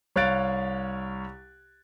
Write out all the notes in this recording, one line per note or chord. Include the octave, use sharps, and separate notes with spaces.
C2 C#5 F5 F#6 A6 D7